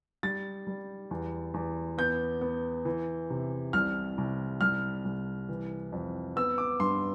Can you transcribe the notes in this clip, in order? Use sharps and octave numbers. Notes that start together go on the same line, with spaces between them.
G3 A6
G3
E2
E2
B3 G6
B3
E3
C3
C2 F6
C2
C2 F6
C2
E3
F2
B3 E6
D6
G2 C6